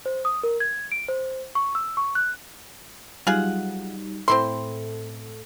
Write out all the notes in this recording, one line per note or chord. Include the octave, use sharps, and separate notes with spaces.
C5
D#6
A#4
G#6
D7
C5
C#6
E6
C#6
F#6
F#3 G3 D#4 F4 G#4 F#5
A2 C4 E4 A4 C6